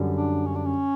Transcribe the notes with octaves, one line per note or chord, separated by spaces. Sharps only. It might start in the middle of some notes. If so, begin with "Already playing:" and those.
Already playing: F#2 D3 G3
D4
C#4
D4
C#4